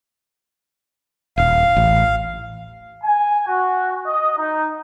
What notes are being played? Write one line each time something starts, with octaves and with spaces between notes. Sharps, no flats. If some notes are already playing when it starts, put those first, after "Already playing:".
D#1 F5
A1
G#5
F#4
D#5
D#4